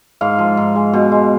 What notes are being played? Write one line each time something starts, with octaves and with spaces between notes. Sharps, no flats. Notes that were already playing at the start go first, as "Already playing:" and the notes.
G#2 F5
F3
G#2
G#3
B2
G#3